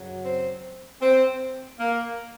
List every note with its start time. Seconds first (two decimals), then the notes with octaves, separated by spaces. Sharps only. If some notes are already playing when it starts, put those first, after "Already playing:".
Already playing: F#2 C#3 F#3
0.25 C4
1.02 C4
1.79 A#3